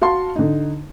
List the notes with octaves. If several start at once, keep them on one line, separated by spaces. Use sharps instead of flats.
F#4 F5 A5 C6
D3 D#4